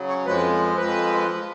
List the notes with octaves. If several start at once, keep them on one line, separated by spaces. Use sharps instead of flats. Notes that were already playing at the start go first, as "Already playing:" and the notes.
Already playing: C#3 F#3
C#5
F2 F3 G#3 B4
F2 F3 G#3 B4